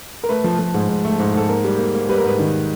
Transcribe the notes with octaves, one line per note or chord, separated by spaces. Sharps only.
A#4
A3 B4
F3
F3
G#2
G#2
A3
G#2
G#2 A4
A#3 A#4
G3
A#3
A#3
G3 B4
A#4
G#2 B4
D#3